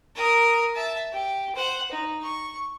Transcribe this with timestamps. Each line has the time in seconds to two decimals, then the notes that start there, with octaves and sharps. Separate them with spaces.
0.15 A#4 D#6
0.74 E5 A5
1.13 G4
1.55 C5 F#5
1.91 D#4
2.22 C#6